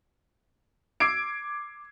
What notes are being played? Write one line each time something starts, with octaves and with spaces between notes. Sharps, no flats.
D6 E6 G#6 C7 D7